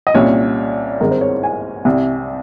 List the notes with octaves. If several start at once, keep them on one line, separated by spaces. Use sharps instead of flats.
D#5
C2 A#2 G3 C#4 C#5
G#1 G2 D#3 G#3 A#4
C5
C#5
G#5
C2 C3 G3